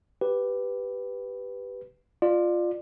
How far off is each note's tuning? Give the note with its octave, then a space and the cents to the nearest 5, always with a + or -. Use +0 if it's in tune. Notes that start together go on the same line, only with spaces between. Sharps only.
G4 +0 B4 +0
F4 +0 D5 +25